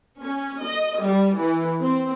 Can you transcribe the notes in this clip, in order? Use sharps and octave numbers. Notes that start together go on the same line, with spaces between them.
C#4
D#5
G3
E3
C4